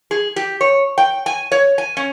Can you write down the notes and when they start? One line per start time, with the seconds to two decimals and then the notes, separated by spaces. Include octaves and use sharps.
0.11 G#4
0.36 G4
0.61 C#5
0.98 G5
1.26 G#5
1.52 C#5
1.78 G#5
1.97 C#4